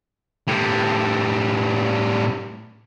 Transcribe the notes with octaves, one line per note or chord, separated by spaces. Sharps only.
A2 G3